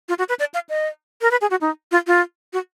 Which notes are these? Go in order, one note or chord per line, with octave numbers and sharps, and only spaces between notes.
F4
F#4
B4
D5
F5
D#5
A#4
B4
G#4
F#4
D#4
F4
F4
F#4